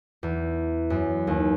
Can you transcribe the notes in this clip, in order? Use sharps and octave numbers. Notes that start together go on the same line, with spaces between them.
E2
F#2
D#2